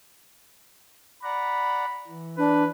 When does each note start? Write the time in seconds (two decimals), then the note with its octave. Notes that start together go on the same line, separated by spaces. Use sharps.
1.23 D5 F#5 A#5 B5
2.07 E3
2.38 D4 B4